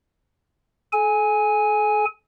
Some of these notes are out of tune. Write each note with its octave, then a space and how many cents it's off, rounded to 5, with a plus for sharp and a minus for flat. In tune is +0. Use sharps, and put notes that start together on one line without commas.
A4 -40 G#5 +0